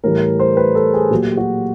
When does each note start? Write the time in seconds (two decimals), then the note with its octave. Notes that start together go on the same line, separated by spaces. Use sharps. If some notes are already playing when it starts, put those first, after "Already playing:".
0.04 A2 E3 G3 A#4
0.40 C5
0.57 B4
0.75 A4
0.94 G#4
1.10 A#2 F#3 G4
1.37 F#4